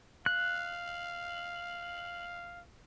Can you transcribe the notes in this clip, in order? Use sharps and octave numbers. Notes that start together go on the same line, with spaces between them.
F5 F#6